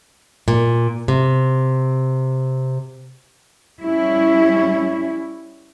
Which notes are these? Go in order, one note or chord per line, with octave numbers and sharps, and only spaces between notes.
A#2
C3
G3 C#4 E4